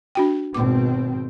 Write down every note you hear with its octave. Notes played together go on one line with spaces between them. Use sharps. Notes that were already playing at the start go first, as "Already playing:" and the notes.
D4 F#4 G5
G#1 B2 C4 D6